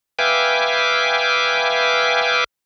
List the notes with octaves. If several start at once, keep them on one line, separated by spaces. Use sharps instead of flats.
B4 E5 F5 G5 G#5 D6